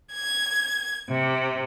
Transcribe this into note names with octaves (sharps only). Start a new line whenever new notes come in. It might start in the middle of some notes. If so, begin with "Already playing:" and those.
G#6
C3